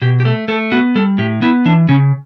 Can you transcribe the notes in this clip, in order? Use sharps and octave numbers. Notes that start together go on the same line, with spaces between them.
B2 G4
G4
A3 A4
A3 A4
B3 F#4
G3 A4
A2 G4
B3 E4
E3 D4
C#3 C#4